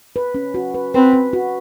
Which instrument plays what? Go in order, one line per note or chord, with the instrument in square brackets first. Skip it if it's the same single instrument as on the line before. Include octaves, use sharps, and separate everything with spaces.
[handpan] B4
C#4
F#4
B4
[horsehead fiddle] C4 [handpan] B4
[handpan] B4
F#4